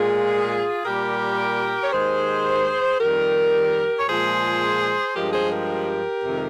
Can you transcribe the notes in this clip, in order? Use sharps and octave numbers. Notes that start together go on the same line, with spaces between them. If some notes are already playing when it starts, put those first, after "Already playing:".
Already playing: A#2 G#3 F4 G#4
A#2 G3 G4 A#4
C#5
D#2 D#3 G#3 G#4 C5
F2 D#3 G3 G4 A#4
C#5
A#2 F3 G#3 G#4 C5
G2 F3 G#3 G4 A#4
G#4 C5
G4 A#4
F2 C3 D#3 G#3